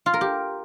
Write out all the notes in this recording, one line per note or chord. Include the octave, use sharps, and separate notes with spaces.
F4
A#4
G4